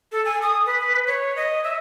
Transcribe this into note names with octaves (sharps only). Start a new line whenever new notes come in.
A4
G#5
D#6
B4
C#5
D#5
E5